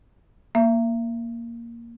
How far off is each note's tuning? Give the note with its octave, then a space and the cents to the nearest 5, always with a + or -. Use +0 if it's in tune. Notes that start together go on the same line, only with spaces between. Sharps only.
A#3 +0 E5 +35